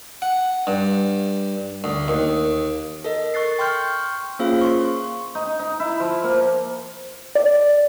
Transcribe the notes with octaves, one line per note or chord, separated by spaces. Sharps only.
F#5
G2
D2
D#2
A4 A#4 D#5
C#6 F#6 A6 C7
G5 C6 C#6 F6 G6
A#3 C#4 F4 G#4 C5 F5
C6 C#6
D#4
D#4
E4
F3
A#3
D5